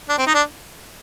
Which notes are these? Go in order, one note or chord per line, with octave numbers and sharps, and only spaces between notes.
D4
C4
D#4
D4